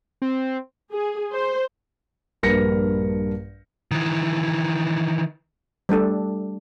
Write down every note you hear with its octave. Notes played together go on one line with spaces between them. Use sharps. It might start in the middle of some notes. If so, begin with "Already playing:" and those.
C4
G#4
C5
A#1 G2 A#4 B4 A#6 C#7
D#3 E3
G3 A3 D4 A4